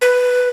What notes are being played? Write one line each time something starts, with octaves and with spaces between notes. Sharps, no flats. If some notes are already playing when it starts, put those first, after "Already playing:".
B4